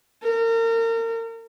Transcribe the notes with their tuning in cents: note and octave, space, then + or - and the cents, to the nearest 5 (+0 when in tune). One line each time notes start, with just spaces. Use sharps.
A#4 -35